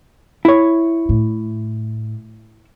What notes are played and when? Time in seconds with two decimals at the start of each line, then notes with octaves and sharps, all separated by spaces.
0.45 E4 C#5
1.09 A2